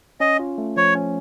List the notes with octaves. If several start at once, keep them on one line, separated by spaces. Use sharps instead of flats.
C#4 D#5
F4
A3
F3 C#5
C#4